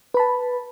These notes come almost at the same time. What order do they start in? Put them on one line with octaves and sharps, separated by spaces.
B4 B5 A5